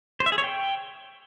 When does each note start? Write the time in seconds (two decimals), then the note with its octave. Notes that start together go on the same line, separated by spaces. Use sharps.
0.20 C5
0.26 E5
0.32 G#4
0.38 C#5
0.44 G5